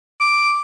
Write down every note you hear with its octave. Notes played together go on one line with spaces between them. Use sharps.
D6